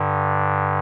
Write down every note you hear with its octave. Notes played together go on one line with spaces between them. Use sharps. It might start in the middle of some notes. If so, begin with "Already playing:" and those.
Already playing: G2 D3